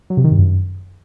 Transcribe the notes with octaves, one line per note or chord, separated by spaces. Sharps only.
F#3
C3
D#3
G2
F#2